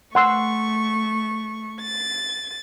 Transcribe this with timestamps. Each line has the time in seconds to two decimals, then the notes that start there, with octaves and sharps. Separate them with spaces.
0.15 A3 F#5 C6 C#6 E6
1.82 A6